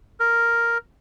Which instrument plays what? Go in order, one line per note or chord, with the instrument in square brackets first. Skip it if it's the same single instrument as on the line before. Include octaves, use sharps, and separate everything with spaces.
[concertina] A#4